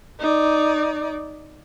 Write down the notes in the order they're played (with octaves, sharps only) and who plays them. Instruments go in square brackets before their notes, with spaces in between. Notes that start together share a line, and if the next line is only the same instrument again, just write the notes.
[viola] D#4 D5